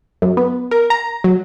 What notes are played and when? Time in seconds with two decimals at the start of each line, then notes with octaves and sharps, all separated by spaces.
0.22 F#2
0.37 B3
0.71 A#4
0.90 A#5
1.24 F#3